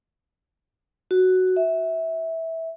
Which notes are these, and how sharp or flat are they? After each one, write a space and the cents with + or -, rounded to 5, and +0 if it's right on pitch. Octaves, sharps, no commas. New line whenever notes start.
F#4 +5
E5 -15